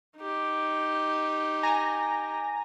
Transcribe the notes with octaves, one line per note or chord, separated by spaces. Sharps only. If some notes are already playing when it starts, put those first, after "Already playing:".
D#4 G4
G#5 A#5 A#6